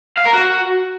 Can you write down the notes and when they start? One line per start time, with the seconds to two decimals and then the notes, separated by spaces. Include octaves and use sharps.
0.18 F5
0.26 A#4
0.34 F#4